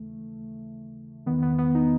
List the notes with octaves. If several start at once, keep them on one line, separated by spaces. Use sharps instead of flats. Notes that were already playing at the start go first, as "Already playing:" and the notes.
Already playing: D#2 C#3 E3 A3
E2 D#3 B3
B3
B3
D#4